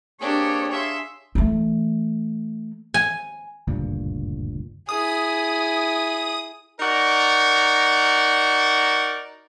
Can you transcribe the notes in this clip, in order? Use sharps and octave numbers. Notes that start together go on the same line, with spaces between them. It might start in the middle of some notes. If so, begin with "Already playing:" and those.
A#3 C4 D4 G4 G#4 C#5
G#4 E5 F5 C6
E3 A3
G#5
F#1 D2 G2 A#2
E4 G#4 D#6
D#4 F#4 A#4 D5